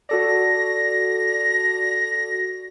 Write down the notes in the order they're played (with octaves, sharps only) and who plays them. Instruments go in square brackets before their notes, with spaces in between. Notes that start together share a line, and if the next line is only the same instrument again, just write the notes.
[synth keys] F#4 A4 D5 [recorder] A#6